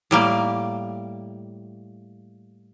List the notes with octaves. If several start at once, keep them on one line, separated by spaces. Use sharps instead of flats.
A2 G3 A#3